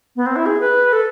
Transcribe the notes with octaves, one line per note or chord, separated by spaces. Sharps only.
B3
C4
E4
G#4
B4
A4